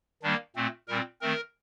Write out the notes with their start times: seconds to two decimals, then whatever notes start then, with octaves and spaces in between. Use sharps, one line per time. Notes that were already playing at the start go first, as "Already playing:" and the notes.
0.23 D#3 G3 A#3 D4
0.56 A#2 A3 C4
0.88 A#2 G3 C4 A#4
1.21 D#3 A3 C4 A#4